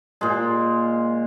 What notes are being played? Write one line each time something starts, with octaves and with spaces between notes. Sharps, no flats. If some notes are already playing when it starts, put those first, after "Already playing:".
A#2 G#3